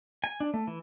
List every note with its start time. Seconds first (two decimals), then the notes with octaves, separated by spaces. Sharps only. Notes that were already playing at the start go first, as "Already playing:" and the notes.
0.24 G#5
0.40 D4
0.54 A3
0.67 E3